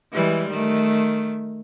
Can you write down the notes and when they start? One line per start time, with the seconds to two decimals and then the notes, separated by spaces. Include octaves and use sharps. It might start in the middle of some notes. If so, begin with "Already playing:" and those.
0.13 E3 G3 G#3
0.50 D#3 A3